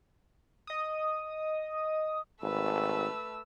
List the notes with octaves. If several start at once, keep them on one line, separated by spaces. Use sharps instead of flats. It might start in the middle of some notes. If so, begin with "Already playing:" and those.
D#5 D#6
G#1 A3 B4 E6